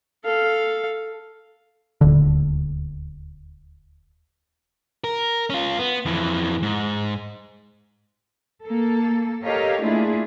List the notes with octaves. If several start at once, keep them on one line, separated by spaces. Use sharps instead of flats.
A4 F5
D#1 D2 D3
A#4
C#4 F4
B3
F2 E3
G#2
A#3 A4
G4 A4 A#4 C#5 D#5 F5
A3 A#3 D4 E4 F4 G#4